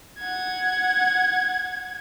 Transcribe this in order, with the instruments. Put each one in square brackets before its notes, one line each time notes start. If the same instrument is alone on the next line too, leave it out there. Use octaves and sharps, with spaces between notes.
[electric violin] F#5 G#6